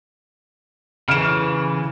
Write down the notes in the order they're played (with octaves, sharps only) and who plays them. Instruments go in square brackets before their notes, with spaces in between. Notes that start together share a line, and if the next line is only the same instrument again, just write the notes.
[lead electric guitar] C#3 E3 [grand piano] F6 D7 E7